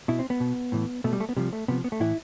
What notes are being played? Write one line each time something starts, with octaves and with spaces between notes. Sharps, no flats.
B2 E4
C4
B3
B2
A2 E3
B2 A3
G3
A3
B3
C3 F3 G3
A3
C3 F3 B3
B3
A3
A2 E3 E4